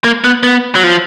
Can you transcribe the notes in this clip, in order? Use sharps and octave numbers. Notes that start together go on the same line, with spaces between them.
A#3
B3
B3
F#3
F3